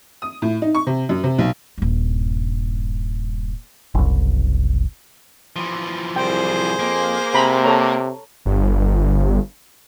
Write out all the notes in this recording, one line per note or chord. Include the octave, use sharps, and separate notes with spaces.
D#6
A2
D#4
C#6
C3
F#2
C3
B1
D#1 G2
F#1 C2
E3 F3
C2 G#4 C5 G5
F2 A#3
C3 A#5 B5
A4 C#5 A#5
G1